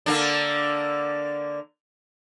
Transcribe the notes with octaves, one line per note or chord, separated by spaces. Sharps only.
D3 A#3 D4